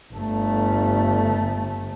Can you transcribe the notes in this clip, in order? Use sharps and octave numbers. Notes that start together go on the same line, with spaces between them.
G1 A3